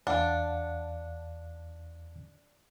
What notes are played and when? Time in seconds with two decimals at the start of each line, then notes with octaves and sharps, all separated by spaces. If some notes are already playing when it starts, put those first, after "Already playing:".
0.07 E2 D4 F5 F#5 A5